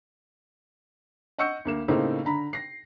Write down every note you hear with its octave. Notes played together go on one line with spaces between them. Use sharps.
D#5 F#5 C#6 E6 G6 C#7
D2 A#3 E7
A2 C#3 A#3 C4 D#4 A4
D3 A#5 B5
A#6 C7